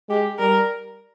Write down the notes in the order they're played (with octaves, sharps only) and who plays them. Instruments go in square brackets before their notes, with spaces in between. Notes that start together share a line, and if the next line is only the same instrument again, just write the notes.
[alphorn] G#3 [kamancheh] G4
[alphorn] G3 [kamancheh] A#4